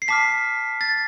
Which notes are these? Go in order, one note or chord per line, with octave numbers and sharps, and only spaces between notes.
C7
A5 D6 F6 B6
A6